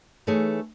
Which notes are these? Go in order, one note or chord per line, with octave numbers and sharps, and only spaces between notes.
E3 A3 D#4 G#4 C#5